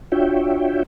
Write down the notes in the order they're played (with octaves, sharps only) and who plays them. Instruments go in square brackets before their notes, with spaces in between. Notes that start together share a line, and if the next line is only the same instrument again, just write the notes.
[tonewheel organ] D4 F4 F#4 C#5 E5 G5